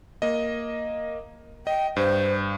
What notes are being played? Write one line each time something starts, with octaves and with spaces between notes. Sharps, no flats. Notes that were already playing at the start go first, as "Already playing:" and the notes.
A#3 D#5
D#5 G5
G2 C5